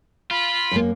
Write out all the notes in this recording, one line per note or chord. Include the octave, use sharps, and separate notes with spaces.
F4 B5
F#2 A#3